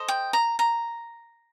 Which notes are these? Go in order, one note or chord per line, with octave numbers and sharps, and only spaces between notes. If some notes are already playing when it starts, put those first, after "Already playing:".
Already playing: A4 C5 D#5
G5
A#5
A#5